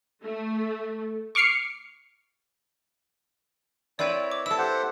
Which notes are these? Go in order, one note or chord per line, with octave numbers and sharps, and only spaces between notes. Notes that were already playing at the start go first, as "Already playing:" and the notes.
A3
C#6 D6 F6 C7 C#7
C4 E4 B4 C#5 D5 G5
D6
E4 A4 E6
G4 C5 F#5